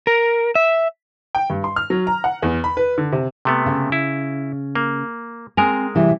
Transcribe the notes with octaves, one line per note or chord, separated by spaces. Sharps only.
A#4
E5
G5
G2
C6
F6
F#3
A#5
F#5
E2
B5
B4
D3
C3
C3 A3 B3
C#3
E4
A#3
G#3 C4 A#4 G#5 A#5
C3 E3 G3